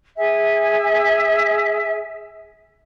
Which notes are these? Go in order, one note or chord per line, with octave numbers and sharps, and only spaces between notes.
G#4 E5 G#5